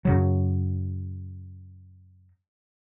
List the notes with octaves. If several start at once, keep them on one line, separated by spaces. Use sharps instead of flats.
F#2 C#3 F#3